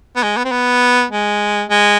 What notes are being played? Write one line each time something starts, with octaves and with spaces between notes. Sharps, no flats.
B3
G#3
B3
C4
B3
G#3
G#3